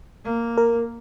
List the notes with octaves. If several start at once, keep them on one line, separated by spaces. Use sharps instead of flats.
A#3
A#4